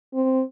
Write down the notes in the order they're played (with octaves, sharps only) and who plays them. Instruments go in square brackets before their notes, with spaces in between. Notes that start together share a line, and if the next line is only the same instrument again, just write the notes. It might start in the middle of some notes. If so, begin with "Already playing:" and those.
[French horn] C4